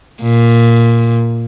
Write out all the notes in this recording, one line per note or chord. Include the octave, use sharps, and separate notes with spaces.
A#2